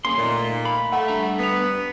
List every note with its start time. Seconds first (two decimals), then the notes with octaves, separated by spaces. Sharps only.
0.05 A#3 C#4 G#4 C6
0.18 A#2 A3 D#4
0.65 F5 B5
0.92 A3 F#5
1.08 G3 D4 A#5
1.39 B3 B6 F7